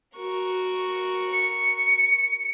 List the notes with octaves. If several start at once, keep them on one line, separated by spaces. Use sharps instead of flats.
F#4 A#4 C#6
C#7